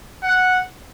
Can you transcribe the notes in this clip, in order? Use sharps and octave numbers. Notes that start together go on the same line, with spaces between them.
F#5